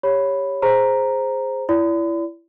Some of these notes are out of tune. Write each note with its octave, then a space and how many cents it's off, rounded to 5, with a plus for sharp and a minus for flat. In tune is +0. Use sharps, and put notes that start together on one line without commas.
G4 +15 C#5 +0 B5 +0
G#4 -10 C5 +0 A#5 +0
E4 +25 D5 -35 B5 +45